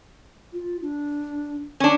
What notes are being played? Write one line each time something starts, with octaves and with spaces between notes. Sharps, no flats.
F4
D4
C#4 D4